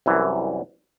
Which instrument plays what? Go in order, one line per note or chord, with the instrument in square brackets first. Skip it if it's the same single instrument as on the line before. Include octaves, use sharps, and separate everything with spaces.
[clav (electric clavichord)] C2 F#2 E3